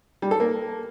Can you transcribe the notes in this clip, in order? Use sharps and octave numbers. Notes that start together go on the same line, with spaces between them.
G3
A4
A#3